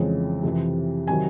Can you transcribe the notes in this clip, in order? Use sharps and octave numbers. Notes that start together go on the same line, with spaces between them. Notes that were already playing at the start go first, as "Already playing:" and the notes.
Already playing: F2 C#3 E3 G#3 C4
F2 C3 E3
C3 D#3 F#3 G#5